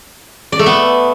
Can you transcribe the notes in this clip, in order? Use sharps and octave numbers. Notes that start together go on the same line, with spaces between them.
D5
A3
B3